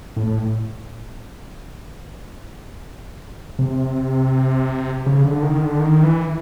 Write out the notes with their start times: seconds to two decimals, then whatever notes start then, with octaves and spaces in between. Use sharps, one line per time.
0.16 A2
3.59 C3
5.06 C#3
5.24 D3
5.43 D#3
5.62 D3
5.79 D#3
6.03 E3